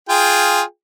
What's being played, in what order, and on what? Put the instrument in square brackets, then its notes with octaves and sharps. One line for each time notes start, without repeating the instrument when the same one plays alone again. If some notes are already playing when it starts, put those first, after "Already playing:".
[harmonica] F4 G#4 G5